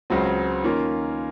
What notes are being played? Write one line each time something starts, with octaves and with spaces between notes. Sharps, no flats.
C#2 C#3 F#3 C4
D#3 A#3 C#4 F4